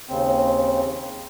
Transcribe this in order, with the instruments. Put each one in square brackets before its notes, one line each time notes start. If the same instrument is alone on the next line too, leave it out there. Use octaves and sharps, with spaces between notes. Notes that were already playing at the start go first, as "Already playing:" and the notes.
[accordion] D#2 C#3 C4